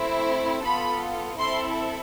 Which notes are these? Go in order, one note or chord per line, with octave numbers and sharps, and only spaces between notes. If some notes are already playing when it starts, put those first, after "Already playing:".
Already playing: A3 C4 E4
B3 F4 A4 B5
C4 E4 A4 C6